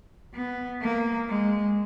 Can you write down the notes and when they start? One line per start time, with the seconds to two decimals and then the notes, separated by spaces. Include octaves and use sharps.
0.34 B3
0.82 A#3
1.29 G#3